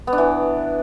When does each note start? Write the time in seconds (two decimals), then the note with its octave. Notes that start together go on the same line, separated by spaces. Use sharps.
0.07 B3
0.13 D4
0.18 E3